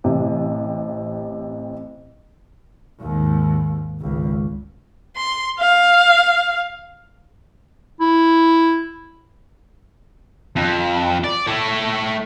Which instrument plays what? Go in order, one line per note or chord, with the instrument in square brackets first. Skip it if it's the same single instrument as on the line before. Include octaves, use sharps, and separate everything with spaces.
[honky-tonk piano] A1 C3
[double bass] D#2 G#2
G#1 C#2
[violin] C6
F5
[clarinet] E4
[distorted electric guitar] F2
D5
A3 C#5